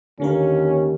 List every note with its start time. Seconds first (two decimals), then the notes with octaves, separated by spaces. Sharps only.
0.20 D#2 D3 A#3 C#4 A#4